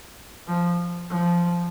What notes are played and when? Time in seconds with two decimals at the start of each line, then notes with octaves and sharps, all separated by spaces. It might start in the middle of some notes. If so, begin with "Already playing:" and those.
0.47 F3
1.10 F3